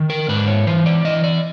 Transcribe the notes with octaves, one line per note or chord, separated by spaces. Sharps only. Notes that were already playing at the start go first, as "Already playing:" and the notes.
Already playing: D#3
A#4
G#2 B4
C#5
E3 C5
D5
E3 D#5
D5